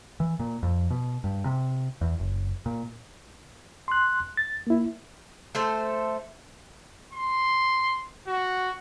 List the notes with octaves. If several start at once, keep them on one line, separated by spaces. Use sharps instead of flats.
E3
A#2
F2
B2
G2
C3
E2
F#1
A#2
C6 F#6
A6
A#3 E4
A3 A4 C5
C6
F#4